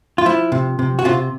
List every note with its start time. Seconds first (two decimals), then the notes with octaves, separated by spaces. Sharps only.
0.18 F4
0.26 F3 E4
0.52 C3
0.79 C3
0.99 F#4
1.05 C3 F4